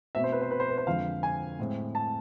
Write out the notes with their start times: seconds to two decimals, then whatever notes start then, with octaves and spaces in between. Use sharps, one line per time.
0.15 B2 A3 C4 E5
0.24 C5
0.32 B4
0.42 C5
0.51 B4
0.60 C5
0.69 B4
0.78 C5
0.87 F2 D3 F3 G#3 F5
1.23 G#5
1.59 A2 G#3 C4
1.95 A5